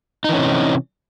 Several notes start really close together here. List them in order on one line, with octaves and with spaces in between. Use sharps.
D#4 E3 C#4 C3